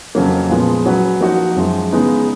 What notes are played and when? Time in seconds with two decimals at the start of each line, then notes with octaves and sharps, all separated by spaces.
0.15 F2 C#3 F#3 A#3
0.49 A#2 F3 G#3 B3
0.85 F#3 C#4 F#4 B4
1.21 F3 A#3 D#4 F#4
1.56 F#2 F3 G#3
1.92 C#3 G#3 B3 D#4